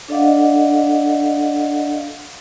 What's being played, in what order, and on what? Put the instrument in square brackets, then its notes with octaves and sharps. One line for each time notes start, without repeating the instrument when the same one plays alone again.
[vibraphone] D4 A4 D5 D#5 F5 F#5